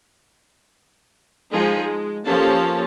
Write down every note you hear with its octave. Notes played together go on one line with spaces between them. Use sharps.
F3 G#3 D#4 G#4
G#3
F3 A#3 C#4 G4 A4 A5